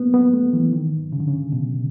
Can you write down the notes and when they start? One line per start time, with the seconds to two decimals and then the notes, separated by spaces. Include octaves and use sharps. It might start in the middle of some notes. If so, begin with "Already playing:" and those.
Already playing: A#3 B3
0.14 B3
0.34 A3
0.53 E3
0.73 D#3
1.12 C#3
1.20 D3
1.28 C#3
1.52 B2